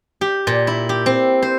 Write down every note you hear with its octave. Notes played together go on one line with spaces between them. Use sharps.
G4
A#2
E4
G4
C4
C5